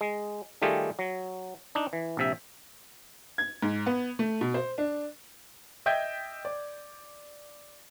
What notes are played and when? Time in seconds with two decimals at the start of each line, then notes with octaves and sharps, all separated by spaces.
0.01 G#3
0.62 D#3 G3 A3 F4 G4 G#4
0.99 F#3
1.75 D4 D#4
1.93 E3
2.17 A#1 C3 E5
3.38 G#6
3.62 G#2
3.86 B3
4.19 A3
4.41 B2
4.54 C5
4.78 D4
5.86 D#5 E5 G5 G6 G#6
6.45 D5